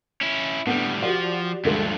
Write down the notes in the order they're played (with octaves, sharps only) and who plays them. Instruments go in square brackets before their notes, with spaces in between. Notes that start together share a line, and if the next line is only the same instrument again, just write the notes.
[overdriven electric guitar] C#4 E4
[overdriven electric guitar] A2 G3 [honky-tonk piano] D3 B3
[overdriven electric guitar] F3 [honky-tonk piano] F#4 G4 D5
[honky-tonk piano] D2 D3 G#3 [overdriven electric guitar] G2 F3